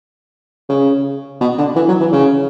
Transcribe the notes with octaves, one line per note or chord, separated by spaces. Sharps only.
C#3
B2
D3
E3
F#3
E3
C#3